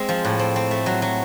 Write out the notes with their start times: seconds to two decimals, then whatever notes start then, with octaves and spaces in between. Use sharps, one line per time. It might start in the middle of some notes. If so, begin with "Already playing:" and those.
Already playing: G#3 C4
0.09 F3
0.25 A2
0.39 C4
0.56 C4
0.71 A3
0.86 F#3
1.02 F#3